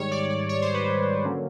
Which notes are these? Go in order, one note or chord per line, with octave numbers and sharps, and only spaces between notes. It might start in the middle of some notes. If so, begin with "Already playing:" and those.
Already playing: G#2 D#3 G3 C#5
D5
D5
C#5
C5
B4
D3 F#3 A#3 C#4